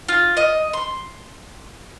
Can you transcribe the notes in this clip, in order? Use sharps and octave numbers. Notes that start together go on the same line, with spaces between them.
F4
D#5
C6